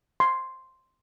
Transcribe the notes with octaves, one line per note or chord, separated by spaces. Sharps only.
C6